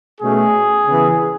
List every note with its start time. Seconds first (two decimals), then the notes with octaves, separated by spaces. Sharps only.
0.21 B2 A3 C#4 G#4
0.85 C#3 E3 B3